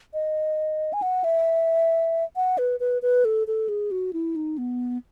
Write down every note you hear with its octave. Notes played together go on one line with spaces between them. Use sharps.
D#5
G#5
F#5
E5
F#5
B4
B4
B4
A4
A4
G#4
F#4
E4
D#4
B3